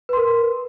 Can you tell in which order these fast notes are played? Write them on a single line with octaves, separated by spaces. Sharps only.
B4 C6 A#4